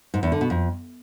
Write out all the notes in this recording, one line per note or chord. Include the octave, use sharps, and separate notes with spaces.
G#2
E2
D3
B2
F2